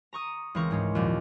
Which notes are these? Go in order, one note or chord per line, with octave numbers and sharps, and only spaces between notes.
A#5 C#6 D#6
C#2 E3 C4 A#4 C#6
G#2 G#3 C#4
D#2 A#2 F3